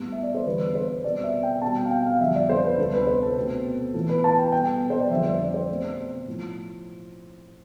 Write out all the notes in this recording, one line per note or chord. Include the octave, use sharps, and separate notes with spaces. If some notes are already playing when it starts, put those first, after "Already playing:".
Already playing: A2 G3 B3
E5
D5
C5
E2 D3 G3 B3 B4
C5
B2 G3 C4 D5
E5
G5
B2 G3 C4 A5
G5
F5
G5
F5
F2 D3 G3 E5
D5
C5
B4
D2 C3 G3 B3 A4
B4
C5
A4
B2 A3 C4
A2 E3 B3 A4
B4
A5
G5
B2 G3 B3 G5
C5
D5
F2 D3 G3 E5
C5
D5
C5
B2 A3 C4
A2 F3